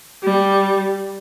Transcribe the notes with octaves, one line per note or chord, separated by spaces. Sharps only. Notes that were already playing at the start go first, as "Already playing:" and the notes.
G3